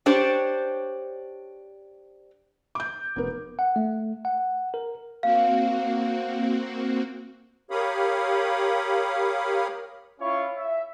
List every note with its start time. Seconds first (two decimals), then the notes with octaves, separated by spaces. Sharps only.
0.06 D4 G4 C5 C#5
2.75 D6 G6
3.16 F1 B3 A#4
3.59 F#5
3.76 A3
4.25 F#5
4.74 A#4
5.23 A#3 C4 F#4 F5
7.71 G4 A#4 C#5 F5 B5 D#6
10.20 C#4 E4 F4 C#5 F5 C#6
10.57 E5